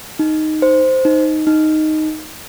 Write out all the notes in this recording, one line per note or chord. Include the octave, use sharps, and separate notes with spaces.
D#4
C5
D#4
D#4